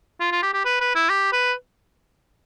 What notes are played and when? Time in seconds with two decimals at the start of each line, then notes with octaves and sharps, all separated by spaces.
0.20 F4
0.32 F4
0.43 G4
0.54 G4
0.65 B4
0.81 B4
0.95 E4
1.09 G4
1.33 B4